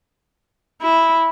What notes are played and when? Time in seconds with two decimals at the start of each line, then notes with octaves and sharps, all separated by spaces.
0.81 E4